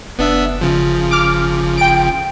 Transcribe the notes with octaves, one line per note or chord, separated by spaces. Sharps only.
F#1 B3 D4 E5
C#3 F3
D6 F6
G5 D7